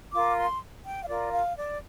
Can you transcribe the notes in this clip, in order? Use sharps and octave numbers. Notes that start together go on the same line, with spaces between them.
F4 A#4 D6
C6
G5
F5
F4 A#4 D5
F5
D5